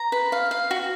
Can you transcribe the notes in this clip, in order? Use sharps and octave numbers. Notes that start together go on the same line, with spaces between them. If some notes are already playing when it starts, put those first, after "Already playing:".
Already playing: A#5
B4
F5
F5
F#4